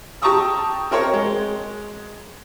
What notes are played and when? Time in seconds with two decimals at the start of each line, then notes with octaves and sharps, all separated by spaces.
0.22 G4 A5 A#5 C#6 D#6 E6
0.91 C4 A#4 C5 C#5
1.13 G#3